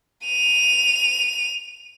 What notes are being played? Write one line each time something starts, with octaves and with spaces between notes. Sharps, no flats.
D#7 F7